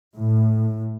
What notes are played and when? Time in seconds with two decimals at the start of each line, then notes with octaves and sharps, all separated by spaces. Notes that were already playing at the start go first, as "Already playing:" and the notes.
0.16 A2